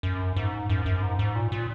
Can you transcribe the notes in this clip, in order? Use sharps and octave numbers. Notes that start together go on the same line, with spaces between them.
F#2
G#2
F#2
F#2
G#2
G#2
A#2
A#2